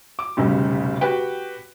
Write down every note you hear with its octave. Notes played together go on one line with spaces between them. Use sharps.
D6
F1 B1 C#3 G3
F#4 G4 B4 G5